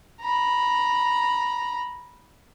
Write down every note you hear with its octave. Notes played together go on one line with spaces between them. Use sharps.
A#5 B5